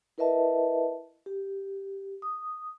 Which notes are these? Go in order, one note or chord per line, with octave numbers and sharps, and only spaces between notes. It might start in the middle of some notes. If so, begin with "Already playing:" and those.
E4 A#4 B4 D#5 E5 A5
G4
D#6